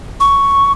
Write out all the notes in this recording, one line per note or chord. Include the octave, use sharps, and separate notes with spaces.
C#6